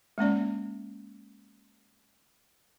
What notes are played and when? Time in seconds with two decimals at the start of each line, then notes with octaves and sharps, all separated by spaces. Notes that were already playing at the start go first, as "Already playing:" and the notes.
0.18 G#3 A#3 C#4 D5